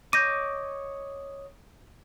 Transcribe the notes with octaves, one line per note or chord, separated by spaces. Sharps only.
C#5 D#5 D6 G6 A#6 D#7